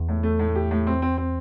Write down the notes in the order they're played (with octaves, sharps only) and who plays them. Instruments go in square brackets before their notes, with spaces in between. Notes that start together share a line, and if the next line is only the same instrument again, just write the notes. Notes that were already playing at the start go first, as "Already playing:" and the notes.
Already playing: [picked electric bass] E2
[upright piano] A2
A3
A2
G4
A2
C4
C4
C4